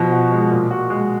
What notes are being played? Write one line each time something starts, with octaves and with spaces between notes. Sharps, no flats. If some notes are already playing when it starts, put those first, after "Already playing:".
Already playing: B2 F3
F#4
G#3
A#2
F#4
G#3